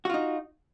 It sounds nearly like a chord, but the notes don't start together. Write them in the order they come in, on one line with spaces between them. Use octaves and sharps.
F#4 F4 D#4